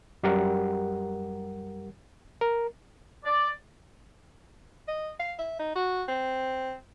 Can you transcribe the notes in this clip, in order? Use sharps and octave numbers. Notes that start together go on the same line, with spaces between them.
F#2 G3 G4 A#4 F#5
A#4
D5
D#5
F5
E5
D#4
F#4
C4